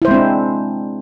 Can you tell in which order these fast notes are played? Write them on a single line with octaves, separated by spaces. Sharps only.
E4 C5 G#3 C4 D4